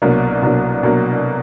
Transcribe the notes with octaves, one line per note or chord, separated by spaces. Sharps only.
C2 B2 F#3 A#3 D4
C2 B2 F#3 A#3 D4
B2 F#3 A#3 D4